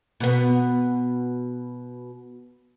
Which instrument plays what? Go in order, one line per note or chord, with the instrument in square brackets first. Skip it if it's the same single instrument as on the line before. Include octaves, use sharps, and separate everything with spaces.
[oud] B2 B3